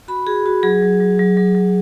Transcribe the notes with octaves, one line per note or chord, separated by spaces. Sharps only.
F#4 B5
F#4 G#4
F#4
F#3 G#4
F#3
F#3
F#3
F#3
F#3